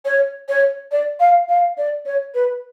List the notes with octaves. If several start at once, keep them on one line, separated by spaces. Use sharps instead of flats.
C#5
C#5
D5
F5
F5
D5
C#5
B4